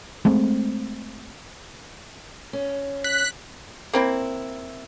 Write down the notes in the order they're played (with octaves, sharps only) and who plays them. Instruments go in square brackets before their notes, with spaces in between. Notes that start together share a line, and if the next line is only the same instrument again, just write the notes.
[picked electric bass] G#3 A3 C4
[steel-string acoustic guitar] C#4
[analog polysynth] F#6 B6
[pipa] A#3 C4 E4